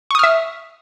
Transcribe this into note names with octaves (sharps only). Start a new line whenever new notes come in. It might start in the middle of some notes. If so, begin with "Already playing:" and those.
E5 C#6 D#6 F6